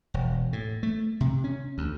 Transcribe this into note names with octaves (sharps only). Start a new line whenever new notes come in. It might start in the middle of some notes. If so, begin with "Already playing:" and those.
E1
A2
A3
C3
C#4
D2